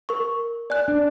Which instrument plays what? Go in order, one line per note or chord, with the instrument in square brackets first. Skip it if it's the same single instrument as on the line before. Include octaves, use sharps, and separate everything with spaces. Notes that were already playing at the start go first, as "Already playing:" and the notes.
[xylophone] A#4 C#6
D5 G#5 F#6
[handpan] D4